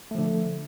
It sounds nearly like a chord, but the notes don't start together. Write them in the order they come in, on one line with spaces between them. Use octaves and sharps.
A3 F3 D3